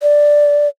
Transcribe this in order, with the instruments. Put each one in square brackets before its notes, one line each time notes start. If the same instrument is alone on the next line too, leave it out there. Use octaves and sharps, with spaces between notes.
[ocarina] D5